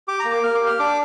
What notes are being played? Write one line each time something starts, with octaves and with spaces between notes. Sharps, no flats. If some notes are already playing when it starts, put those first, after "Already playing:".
G4 D6
A#5
A#3
D6
A#3 F6
D6
G4
F6
D4 D6